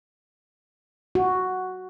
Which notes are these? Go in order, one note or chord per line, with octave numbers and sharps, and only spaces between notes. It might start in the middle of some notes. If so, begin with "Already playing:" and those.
F#4